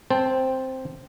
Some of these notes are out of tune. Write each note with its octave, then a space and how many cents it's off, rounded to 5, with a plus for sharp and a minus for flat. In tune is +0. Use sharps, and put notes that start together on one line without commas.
C4 +0 C5 +0 A5 -10